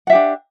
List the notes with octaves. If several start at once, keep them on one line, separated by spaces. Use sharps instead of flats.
D4 G4 E5 F#5